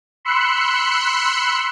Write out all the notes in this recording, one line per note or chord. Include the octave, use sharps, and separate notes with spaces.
B5 C6 E6 F#6 C#7